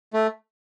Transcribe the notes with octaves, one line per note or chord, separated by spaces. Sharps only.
A3